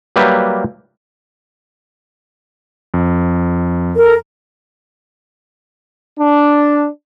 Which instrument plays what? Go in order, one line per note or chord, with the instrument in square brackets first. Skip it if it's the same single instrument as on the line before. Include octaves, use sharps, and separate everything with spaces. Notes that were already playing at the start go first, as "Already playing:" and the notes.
[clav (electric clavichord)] F#3 G3 A#3 G4 B4 E5
[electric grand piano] F2
[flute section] A4 A#4
[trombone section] D4